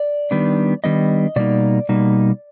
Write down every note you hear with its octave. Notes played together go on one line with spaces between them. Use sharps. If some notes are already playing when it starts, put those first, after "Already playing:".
Already playing: D5
D#3 G3 B3 D4
D#3 G3 B3 D4 D#5
B2 G3 A#3 D#4 D5
B2 G3 A#3 D#4